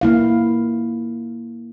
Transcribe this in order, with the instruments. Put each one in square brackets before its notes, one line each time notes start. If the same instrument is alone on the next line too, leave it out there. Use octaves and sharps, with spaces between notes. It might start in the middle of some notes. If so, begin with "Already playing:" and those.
[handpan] A#3 E4 F5